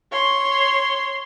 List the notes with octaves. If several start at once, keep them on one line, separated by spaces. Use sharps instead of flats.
C#5 C6